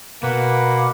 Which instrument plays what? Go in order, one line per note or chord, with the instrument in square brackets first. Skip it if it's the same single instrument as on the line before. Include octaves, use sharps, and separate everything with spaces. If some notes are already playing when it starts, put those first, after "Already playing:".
[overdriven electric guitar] B2 [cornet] A#3 [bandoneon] B4 F#5 B5